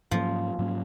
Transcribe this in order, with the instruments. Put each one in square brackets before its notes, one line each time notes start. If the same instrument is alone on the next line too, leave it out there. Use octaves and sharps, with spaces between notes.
[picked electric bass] G#2 F#3 A#3 C#4 [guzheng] F3
[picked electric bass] G#2 F#3 A#3 C#4